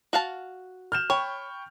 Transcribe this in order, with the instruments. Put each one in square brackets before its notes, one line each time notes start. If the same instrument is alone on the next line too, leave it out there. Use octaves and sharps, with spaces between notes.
[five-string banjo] F#4 F5 A5
[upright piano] F6 G6 E7
[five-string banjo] C#5 [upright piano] G5 B5 C#6